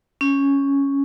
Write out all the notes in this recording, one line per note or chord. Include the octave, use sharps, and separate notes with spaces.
C#4